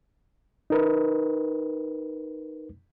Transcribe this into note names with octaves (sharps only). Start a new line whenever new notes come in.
D#4 A#4 B4